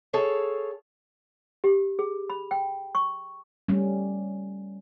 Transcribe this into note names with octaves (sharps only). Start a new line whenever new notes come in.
G#4 A4 C#5 F5
G4
G#4
B5
G5
C#6
G3 A3 C#4